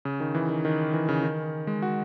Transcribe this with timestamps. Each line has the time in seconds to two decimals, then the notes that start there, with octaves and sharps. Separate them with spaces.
0.05 C#3
0.20 D#3
0.35 E3
0.50 D#3
0.65 D#3
0.94 E3
1.09 C#3
1.23 D#3
1.67 G#3
1.82 F#4